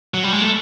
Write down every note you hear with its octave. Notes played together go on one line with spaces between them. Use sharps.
F#3
G3
G#3
A3